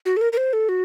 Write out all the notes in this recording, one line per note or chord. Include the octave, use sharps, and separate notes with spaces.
F#4
A4
A#4
A#4
C5
A4
F#4